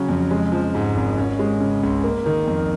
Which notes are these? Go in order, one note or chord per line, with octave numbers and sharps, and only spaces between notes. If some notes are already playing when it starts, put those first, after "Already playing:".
Already playing: C#3 F#3 C#4
F2
G#3
F3
G#2
G#1
C#4
G#3
C#3
C#2
A#3
D#3
F2